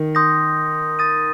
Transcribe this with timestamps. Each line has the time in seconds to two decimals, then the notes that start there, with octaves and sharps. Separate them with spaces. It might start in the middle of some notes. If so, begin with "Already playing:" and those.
Already playing: D#3
0.15 C6 D#6 G6 A#6
0.99 D#6 A6 D#7